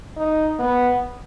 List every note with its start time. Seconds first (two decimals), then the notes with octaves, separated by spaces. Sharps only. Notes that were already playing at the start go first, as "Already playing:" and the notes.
0.17 D#4
0.59 B3